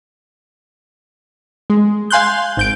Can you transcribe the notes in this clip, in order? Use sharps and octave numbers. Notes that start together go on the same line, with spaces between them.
G#3
F5 G#5 C6 F#6 G6
G#1 G6 D7